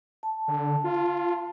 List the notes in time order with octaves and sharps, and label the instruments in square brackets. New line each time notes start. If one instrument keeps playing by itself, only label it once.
[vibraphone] A5
[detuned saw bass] D3 [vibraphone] A5
[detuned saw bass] F4